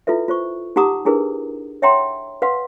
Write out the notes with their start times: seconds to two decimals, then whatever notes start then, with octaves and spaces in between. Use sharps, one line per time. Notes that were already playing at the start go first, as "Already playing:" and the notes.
0.07 E4 F4 A4 B4 E5
0.28 F4 C5 C#6
0.76 D#4 G4 F#5 A#5 D6 D#6
1.05 D4 E4 G#4 A#4 B4
1.82 C#5 E5 F#5 G5 A#5 C6
2.42 B4 F5 F#5 C6